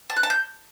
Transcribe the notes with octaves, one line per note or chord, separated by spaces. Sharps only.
A5
F#6
A5
G6